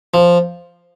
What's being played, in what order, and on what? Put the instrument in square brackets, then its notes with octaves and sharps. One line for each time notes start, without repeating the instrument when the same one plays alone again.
[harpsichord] F3